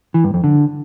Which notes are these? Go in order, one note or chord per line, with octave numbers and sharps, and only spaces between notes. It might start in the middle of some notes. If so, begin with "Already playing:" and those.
E3
G2
F2
D3